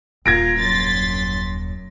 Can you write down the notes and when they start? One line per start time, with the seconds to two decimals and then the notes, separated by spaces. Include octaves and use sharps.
0.26 D#1 F4 A#4 G#6 A#6 D7
0.59 F#2 C6 A6 B6